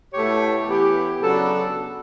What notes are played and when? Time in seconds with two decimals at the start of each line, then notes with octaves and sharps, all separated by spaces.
0.13 B2 A3 E4 G4 C#5
0.67 E3 B3 E4 G4
1.21 C#3 F#3 B3 D4 A4